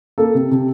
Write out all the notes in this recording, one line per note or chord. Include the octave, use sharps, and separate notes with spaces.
A#3 A4
C3
C3